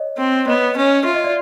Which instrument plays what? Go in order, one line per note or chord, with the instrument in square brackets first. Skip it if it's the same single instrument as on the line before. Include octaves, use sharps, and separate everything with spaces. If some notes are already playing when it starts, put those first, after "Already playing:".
Already playing: [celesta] C#5 D#5
[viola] C4
[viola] B3 [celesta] C#5 D#5
[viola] C#4
[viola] F4 [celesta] E5
[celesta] D#5
D5 E5